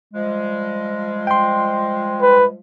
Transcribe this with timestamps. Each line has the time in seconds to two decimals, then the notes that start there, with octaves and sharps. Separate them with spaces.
0.14 F3 G3 G#3
1.27 G5 C6
2.22 B4